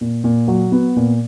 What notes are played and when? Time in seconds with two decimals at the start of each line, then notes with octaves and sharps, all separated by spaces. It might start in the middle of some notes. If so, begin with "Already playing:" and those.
0.01 A#2
0.24 A#2
0.48 F#3
0.72 B3
0.96 A#2